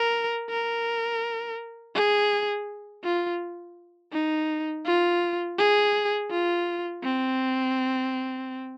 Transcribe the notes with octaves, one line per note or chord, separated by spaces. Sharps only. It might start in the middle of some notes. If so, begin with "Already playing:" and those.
Already playing: A#4
A#4
G#4
F4
D#4
F4
G#4
F4
C4